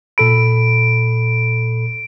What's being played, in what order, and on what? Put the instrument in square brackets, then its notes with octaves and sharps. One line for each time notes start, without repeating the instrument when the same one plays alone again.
[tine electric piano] A#2 A4 B5 [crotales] D7